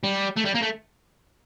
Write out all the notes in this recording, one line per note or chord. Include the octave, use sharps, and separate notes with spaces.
G3
A3
G3
A#3
A3